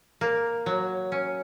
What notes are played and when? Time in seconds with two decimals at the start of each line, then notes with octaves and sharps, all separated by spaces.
0.21 A#3
0.66 F#3
1.12 C#4